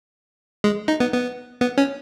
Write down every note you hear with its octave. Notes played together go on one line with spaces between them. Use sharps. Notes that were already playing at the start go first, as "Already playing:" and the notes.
G#3
D#4
B3
B3
B3
C#4